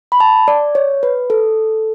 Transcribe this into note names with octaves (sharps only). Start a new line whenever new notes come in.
B5
A5
D5
C#5
B4
A4